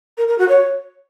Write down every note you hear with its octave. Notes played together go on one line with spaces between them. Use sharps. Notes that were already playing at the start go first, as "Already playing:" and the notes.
A#4
A#4
F#4
C#5